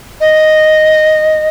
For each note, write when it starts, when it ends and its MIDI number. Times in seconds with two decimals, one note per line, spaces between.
0.20 1.48 75